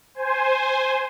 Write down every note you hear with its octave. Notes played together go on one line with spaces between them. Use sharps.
C5 G#5